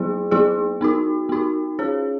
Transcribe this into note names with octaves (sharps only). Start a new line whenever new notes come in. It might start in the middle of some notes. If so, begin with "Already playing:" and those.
Already playing: F#3 B3 E4 G#4
F#3 B3 E4 G#4
B3 D#4 F#4
B3 D#4 F#4
C#4 G#4 C#5